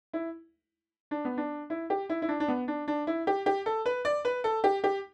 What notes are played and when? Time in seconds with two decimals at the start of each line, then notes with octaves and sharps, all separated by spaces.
0.13 E4
1.11 D4
1.25 B3
1.37 D4
1.70 E4
1.90 G4
2.09 E4
2.22 E4
2.29 D4
2.40 D4
2.48 B3
2.68 D4
2.88 D4
3.07 E4
3.27 G4
3.46 G4
3.66 A4
3.86 B4
4.05 D5
4.25 B4
4.44 A4
4.64 G4
4.84 G4